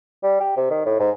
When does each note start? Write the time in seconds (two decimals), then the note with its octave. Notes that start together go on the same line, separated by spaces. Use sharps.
0.23 G3
0.40 G4
0.57 C3
0.71 D#3
0.86 A2
1.00 G#2